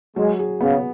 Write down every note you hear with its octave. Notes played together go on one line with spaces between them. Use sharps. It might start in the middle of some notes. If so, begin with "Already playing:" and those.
F#3 G#3
G#4
C#3 B3